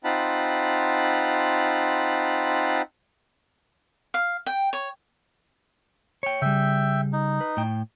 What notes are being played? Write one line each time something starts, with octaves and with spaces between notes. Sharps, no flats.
C4 D#4 F4 F#5 A5 B5
F5
G5
C#5
C#5 G5
C#3 G3 E5 G5
D#4
B4
A2 G5